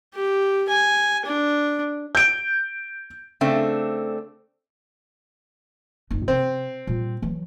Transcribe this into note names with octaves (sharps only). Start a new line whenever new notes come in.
G4
G#5
D4
G6 D7
C#3 A3 C4 D4
F#1 D#4
C3 C4
A#2 G3
E3 F#3